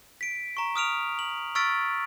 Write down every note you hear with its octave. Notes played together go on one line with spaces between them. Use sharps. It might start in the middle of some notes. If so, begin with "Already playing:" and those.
B6 D7
A#5 C#6
D#6 F6 D7 F7
F#7
C#6 E6 F6 A6 B6 D7